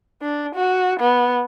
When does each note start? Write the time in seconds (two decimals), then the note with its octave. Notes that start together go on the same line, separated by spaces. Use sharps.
0.22 D4
0.55 F#4
1.00 B3